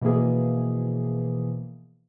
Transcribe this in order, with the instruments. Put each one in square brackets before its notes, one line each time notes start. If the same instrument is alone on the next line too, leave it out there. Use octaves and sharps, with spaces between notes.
[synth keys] B2 E3 F3 A#3 G#4